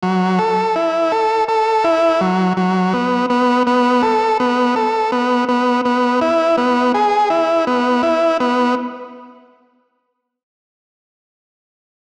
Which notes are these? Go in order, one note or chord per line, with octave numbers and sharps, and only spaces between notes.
F#3
A4
E4
A4
A4
E4
F#3
F#3
B3
B3
B3
A4
B3
A4
B3
B3
B3
E4
B3
G#4
E4
B3
E4
B3